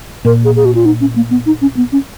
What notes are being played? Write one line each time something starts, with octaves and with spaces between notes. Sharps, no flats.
A#2 A#4
G#4
G#4
F#4
F4
D#4
C#4
A#3
B3
D#4
C#4
B3
C#4